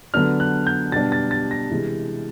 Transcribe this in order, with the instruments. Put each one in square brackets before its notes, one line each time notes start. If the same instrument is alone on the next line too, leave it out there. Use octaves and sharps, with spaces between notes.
[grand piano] D3 F#3 B3 D4 F6
F#6
G6
B2 G3 B3 D4 A6
A6
A6
A#6
C3 E3 G#3